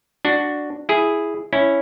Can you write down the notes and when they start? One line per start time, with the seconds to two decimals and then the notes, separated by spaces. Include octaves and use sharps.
0.25 D4 F#4
0.89 E4 G#4
1.53 C#4 E4